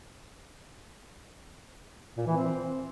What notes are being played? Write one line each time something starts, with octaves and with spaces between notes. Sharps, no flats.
A#2
E3
C4